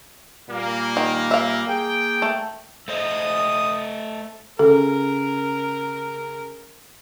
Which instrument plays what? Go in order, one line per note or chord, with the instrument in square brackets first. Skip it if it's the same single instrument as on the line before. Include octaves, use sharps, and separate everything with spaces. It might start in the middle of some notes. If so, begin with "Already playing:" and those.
[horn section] A#2 G3 A#3
[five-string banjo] D#3
E5 F5
[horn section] A#3 G#4 G5
[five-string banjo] A3
[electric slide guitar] A3 C5 D#5 [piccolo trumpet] D#6
[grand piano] C#3 [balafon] A4 [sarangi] A#4